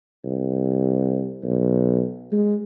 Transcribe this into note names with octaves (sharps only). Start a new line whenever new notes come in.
C2
B1
G#3